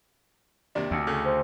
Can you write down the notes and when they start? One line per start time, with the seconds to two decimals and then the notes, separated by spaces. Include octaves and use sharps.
0.75 D#2 C3 D4
0.91 D2
1.07 C#3 A3
1.25 C5